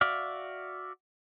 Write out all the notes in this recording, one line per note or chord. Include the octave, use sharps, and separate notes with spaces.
F#4 D5 E5 F5